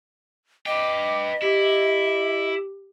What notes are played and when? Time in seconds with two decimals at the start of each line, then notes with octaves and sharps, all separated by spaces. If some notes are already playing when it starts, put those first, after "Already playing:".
0.66 B4 D#5 G5 D6
1.42 E4 G4